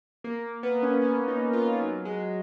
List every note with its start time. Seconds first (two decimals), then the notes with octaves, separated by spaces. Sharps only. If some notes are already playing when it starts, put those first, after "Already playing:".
0.24 A#3
0.63 B3
0.83 C#4
1.02 C#4
1.28 D#4
1.53 F4
1.79 F#3
2.05 G#3